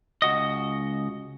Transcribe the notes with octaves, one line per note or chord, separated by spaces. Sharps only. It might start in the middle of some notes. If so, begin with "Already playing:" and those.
C#2 F#4 D#5